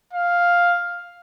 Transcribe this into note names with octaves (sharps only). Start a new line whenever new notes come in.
F5